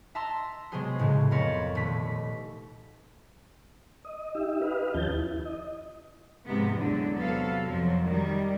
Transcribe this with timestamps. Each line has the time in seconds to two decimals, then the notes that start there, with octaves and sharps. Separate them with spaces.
0.15 E5 A5 A#5 C6 E6
0.72 C3 F#3 G#3 B3 G#4 C5
0.98 C#2 A2 C#3 E3 G#3
1.31 F2 C4 A#4 C#5 B5 A6
1.75 D#1 A3 B6
4.05 D#5
4.35 D#4 G4 E5
4.62 G4 B4 D#5 F5
4.94 D#2 F3 C#4 F4 A5 G6
5.13 E4
5.45 D#5
6.45 G#2 C3 F3 B3
6.77 E2 D3 F#3 G#3 D4
7.16 C3 F#3 B3 A4 F5
7.64 F2 F3 F#3
8.05 D#3 G3